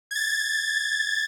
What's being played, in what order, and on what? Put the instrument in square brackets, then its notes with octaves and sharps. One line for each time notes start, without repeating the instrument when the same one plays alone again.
[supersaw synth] G#6 A6